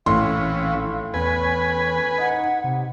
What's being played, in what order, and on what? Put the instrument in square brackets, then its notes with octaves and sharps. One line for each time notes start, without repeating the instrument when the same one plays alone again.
[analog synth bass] A#1 [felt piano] A2 C6 [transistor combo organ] E3 C#4 [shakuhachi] F5
[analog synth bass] E2 [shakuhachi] C#4 [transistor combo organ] B4 G#5
[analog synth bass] D#4 [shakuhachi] F#5
[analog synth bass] C3